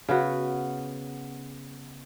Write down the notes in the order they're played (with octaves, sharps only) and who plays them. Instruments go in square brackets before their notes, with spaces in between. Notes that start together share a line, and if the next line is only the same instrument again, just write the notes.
[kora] C#3 B3 F#4